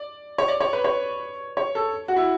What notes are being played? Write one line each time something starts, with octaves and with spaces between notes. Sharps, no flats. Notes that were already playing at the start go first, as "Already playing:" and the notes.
Already playing: D5
C#5
D5
C#5
B4
C#5
C#5
A4
F#4
E4